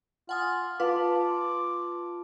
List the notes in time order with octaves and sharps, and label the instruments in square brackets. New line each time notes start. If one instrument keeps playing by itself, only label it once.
[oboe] F4 [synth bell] F#5 G#5 D#6
[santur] F4 A5 [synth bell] B4 [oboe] D6